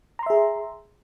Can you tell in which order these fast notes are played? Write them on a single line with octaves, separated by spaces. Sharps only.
A#5 C6 E5 G#4